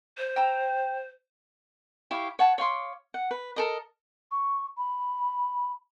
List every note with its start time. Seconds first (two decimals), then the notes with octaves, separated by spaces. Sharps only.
0.18 C5
0.36 G5 A#5 E6
2.11 E4 G4 C#5 F5
2.39 C#5 F#5 A5
2.58 C#5 F5 C6 D6
3.14 F#5
3.31 B4
3.56 A4 A#4 D#5
4.32 C#6
4.78 B5